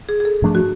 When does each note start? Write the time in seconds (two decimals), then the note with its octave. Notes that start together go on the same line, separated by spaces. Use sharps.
0.09 G#4
0.20 G#4
0.25 A4
0.42 G#2 F3 A3 D4
0.55 F#4